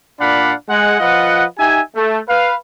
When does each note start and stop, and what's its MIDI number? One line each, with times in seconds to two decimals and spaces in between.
0.20 0.53 46
0.20 0.53 62
0.20 0.53 74
0.20 0.53 77
0.20 0.53 78
0.20 0.53 83
0.69 0.96 56
0.69 0.96 78
1.00 1.45 53
1.00 1.45 65
1.00 1.45 71
1.00 1.45 75
1.00 1.45 78
1.58 1.81 63
1.58 1.81 67
1.58 1.81 76
1.58 1.81 80
1.96 2.19 57
2.28 2.55 71
2.28 2.55 77